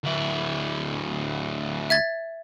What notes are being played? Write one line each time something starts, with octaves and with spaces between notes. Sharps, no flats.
D2 E4
E5 G#6 A6